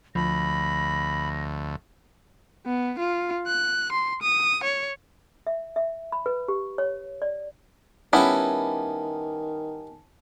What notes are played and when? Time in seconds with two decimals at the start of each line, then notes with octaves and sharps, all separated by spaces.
0.15 D2 F3 B5 A#6
2.66 B3
2.99 F4
3.47 F#6
3.92 C6
4.22 D#6
4.64 C#5
5.47 E5
5.76 E5
6.12 B5
6.26 B4
6.48 G4
6.78 C#5
7.22 D5
8.13 D#3 G3 B3 C#4 E4 A#4 G#5 A5